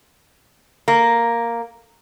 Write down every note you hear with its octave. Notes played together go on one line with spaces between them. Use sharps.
A#3